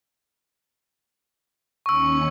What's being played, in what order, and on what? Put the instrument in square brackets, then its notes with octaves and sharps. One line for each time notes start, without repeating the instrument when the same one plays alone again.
[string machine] D#2 C#4 C#7 [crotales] C#6 E6